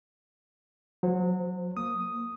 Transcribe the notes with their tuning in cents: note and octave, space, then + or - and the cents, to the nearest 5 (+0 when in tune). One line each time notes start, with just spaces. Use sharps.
F#3 -25 C5 -5
A#3 +0 D#6 +0